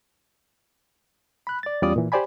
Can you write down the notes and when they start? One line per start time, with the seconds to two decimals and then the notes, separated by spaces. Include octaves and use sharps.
1.47 B5 F#6
1.63 D5 A6
1.82 E2 G3 C#4 F4 D5 D#6
1.96 A#2 E3
2.12 G4 C5 D5 G#5 B5